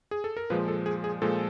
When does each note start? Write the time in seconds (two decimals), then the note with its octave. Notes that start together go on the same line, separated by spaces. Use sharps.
0.11 G#4
0.24 A4
0.37 A#4
0.50 A#2 F3 G#3 B4
0.68 A4
0.86 G#4
1.04 G#4
1.22 A#2 F3 G#3 A4